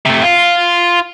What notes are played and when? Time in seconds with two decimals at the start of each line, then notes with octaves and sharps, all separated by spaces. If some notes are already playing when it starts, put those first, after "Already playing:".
0.06 C3 A3
0.23 F4